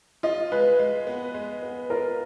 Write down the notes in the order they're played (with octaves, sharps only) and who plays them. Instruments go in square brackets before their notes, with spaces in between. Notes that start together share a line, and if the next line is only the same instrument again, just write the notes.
[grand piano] F4 [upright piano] D#5
[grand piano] G#3 [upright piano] B4
[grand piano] G#3
B3
G#3
B3
[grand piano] F4 [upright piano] A#4